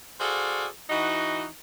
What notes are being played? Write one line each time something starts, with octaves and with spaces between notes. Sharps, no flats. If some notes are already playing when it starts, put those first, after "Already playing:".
F#4 G#4 A4 C5 D5 F5
E3 D#4 F#4